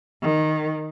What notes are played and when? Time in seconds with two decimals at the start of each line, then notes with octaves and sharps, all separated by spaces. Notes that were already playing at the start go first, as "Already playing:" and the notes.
0.23 D#3